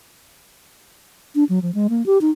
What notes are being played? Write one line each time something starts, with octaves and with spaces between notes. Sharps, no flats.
D4
F#3
F3
G#3
A#3
G4
D#4